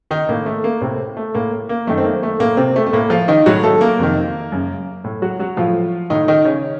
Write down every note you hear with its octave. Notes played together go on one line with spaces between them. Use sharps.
D#3 D#4
A2 A#3
A3
A#3
A2 C3 C4
A3
A2 A#3
A#3
F#2 D#3 A3
C4
A#3
A3
A2 A#3
C3 C4
A3
A3
A2 A#3
F3 F4
D#3 D#4
A2 F#3 F#4
A3 A4
A#3 A#4
F2 C3 D#3
F#2 C#3
A2
F#3 F#4
F#3 F#4
A2 F3 F4
A2 D#3 D#4
D#3 D#4
C#3 C#4